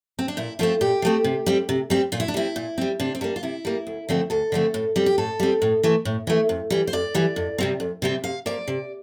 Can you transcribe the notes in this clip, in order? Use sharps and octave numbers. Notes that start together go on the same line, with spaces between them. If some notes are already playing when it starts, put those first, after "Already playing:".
C4
D4
A#2 E4
F3 A3 C4 F4
A#2 G4
F3 A3 C4
C3
G3 C4
C3
G3 C4
A#2 F4
E4
D4
G3 C4 E4
A#2
G3 C4
C3 D4
C4
G3 A#3 D4
F4
C3 E4
G3 A#3
D2
D3 F3 A3 C4
D2 A4
D3 F3 A3 C4
A2
G3 C4
G4
A2 A4
G3 C4
A2
E3 A3
A2
E3 A3
F2
E3 G3
C5
F2 D5
E3 G3
F2
C3 G3 C4
F2
C3 G3 C4
C3 F5
F3 A#3 D5
C3